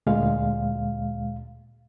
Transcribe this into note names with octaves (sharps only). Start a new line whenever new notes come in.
D2 A#2 G#3 F5